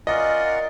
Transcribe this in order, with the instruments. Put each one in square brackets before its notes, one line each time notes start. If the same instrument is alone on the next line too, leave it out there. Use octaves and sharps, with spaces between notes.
[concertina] C#4 F4 A#4 D5 F#5 [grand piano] D#5